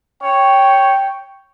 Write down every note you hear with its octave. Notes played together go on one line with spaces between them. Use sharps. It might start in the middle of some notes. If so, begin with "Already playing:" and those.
C#5 G5